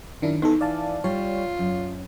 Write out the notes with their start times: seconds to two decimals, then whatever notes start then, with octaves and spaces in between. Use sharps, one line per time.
0.22 F#2 D#3 D4 E4
0.42 E3 B3 D#4 A4
0.61 E3 D5 F5 A5
1.04 G3 F4 C#5
1.59 F#2